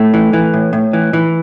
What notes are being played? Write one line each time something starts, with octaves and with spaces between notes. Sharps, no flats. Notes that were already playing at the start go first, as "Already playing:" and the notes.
Already playing: A2 A3
E3
E3
A2
A2
E3
E3